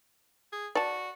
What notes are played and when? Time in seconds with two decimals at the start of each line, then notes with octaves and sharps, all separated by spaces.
0.52 G#4
0.75 F#4 D5 A5